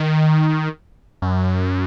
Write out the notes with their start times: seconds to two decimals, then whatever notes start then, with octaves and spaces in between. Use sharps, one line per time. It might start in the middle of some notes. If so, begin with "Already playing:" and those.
Already playing: D#3
1.22 F#2